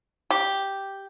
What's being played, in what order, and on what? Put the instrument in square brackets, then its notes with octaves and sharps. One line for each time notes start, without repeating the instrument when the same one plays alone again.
[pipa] G4